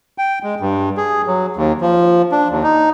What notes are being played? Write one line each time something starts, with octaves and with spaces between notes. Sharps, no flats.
G5
G#3
G2
G#4
F#3
D#2
F3
D4
D#2
D#4